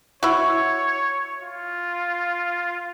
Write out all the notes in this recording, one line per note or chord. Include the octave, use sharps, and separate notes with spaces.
E4 F#4 C#5
F4